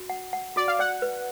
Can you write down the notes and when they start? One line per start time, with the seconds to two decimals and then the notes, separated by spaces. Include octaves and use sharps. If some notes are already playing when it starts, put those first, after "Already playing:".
Already playing: F#4
0.10 F#5
0.33 F#5
0.56 F#4 D5
0.68 F5
0.79 D5 F#5
1.02 B4